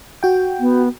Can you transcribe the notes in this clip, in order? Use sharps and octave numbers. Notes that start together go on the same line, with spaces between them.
F#4 G5
B3